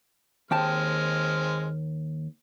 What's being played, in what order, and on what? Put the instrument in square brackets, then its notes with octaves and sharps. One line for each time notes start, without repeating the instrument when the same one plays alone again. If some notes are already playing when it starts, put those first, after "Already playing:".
[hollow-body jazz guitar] D#2 G5 A5 [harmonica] G#3 C4 F6